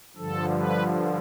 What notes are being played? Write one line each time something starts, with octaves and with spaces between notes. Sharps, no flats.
G2 D3 F3 A4
B4